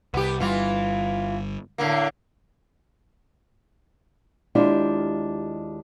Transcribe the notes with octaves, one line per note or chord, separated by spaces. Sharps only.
C2 B3 G4
G1 E3 G3 F4
A2 D3 A#3
D#2 G#3 D4 E4 F4 G4